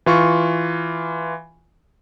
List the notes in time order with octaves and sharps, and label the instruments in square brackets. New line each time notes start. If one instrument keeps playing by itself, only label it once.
[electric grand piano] E3 F4 C#6